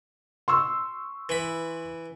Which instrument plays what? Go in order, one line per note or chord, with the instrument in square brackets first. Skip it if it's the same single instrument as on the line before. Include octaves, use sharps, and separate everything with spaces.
[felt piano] C6 C#6 E6
[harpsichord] E3 B5